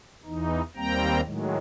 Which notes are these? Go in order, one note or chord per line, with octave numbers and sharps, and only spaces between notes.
E2 E3 D#4
D#2 G3 A#3 C4 G5 A#5
A2 D#3 F#3 G#3